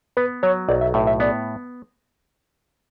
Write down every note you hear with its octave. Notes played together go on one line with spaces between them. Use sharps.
B3 B4
F#3 C#5
B1 D5
E5
A2 E5
E5
B3 D5